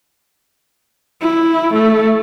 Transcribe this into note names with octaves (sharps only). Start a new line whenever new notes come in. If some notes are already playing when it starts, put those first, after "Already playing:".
E4
A3